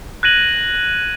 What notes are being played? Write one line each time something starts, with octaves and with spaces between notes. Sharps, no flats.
F#6 G#6 A#6 D#7 F#7